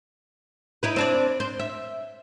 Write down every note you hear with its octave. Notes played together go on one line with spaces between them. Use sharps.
D#4 E4 B4
C4 D4 D5
C5
E5